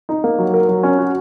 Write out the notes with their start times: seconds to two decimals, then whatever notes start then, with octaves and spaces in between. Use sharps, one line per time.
0.09 D#4
0.24 A#3
0.39 F#3
0.54 A#4
0.68 F#3
0.83 C#4
0.99 F#4